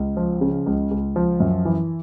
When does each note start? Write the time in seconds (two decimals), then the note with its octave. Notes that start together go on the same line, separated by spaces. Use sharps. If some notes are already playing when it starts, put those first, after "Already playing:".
Already playing: C#2
0.17 F3
0.41 C#3
0.66 C#2
0.91 C#2
1.16 F3
1.40 F#2
1.65 E3